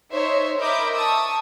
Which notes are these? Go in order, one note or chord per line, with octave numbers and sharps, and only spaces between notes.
D#4 C5 C#5 E5 C6
A#4 D#5 E5 B5 D6 G6
A5 C#6 D#6 E6